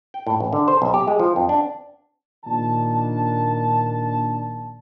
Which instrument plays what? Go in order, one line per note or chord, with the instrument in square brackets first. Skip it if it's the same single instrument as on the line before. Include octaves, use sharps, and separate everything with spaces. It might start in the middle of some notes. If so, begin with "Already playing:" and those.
[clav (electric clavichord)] G5
A2
A1
D3
C5
B1
G4
G#3
F3
F2
D4
[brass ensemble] A#1 A#2 D#3 D4 A5